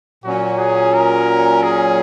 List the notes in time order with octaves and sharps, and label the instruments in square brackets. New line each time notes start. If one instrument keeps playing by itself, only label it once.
[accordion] A#2 F#3 C#4 [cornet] F#4
[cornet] G#4
A#4
G#4